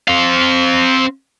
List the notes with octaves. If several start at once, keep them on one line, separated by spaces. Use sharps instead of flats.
C4 F5